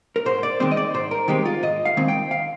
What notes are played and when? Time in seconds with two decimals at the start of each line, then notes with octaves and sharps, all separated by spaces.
0.16 A#4
0.26 G#2 C5
0.43 D5
0.60 D#3 G#3 C4 C5
0.71 D#5
0.77 D5
0.94 G#2 C5
1.11 A#4
1.28 D#3 G#3 C4 G4
1.45 F4
1.63 G#2 D#5
1.85 F5
1.97 D#3 G#3 C4
2.08 G5
2.31 F5